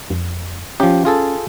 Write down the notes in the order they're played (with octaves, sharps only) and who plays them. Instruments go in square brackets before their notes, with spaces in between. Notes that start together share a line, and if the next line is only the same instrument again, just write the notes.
[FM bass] F2
[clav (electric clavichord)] F3 G4 [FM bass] C#4
[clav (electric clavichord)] F4 G#4 A4